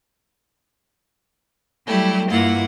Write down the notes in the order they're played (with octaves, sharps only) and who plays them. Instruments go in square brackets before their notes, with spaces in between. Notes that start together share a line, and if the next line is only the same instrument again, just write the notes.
[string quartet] F#3 G3 A3 E4 G4
G2 A#3 E4 F4 F#5